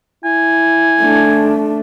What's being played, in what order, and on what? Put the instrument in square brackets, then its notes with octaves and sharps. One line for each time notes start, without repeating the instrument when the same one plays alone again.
[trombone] E4 [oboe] G#5
[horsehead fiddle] A3 D4